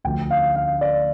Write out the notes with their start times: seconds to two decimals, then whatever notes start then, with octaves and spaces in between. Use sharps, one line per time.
0.04 D2 D3 F3 A3 G5
0.31 F5
0.56 F5
0.81 D5